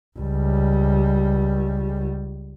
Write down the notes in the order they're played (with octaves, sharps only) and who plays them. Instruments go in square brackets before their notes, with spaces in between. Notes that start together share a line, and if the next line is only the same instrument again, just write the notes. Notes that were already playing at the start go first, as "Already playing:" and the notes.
[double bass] C#2 G3